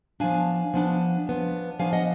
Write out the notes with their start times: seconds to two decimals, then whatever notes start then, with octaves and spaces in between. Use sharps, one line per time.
0.20 F3 B3 D4 F5 G#5
0.74 F3 B3 D4
1.27 F3 B3 D4
1.79 F3 B3 D4 F5 G#5
1.93 D#5 F#5